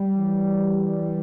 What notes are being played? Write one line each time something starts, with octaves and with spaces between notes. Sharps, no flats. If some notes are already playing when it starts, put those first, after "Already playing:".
Already playing: G3
E3